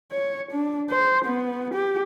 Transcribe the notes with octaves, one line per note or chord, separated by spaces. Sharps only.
C#5
D4
C5
B3
G4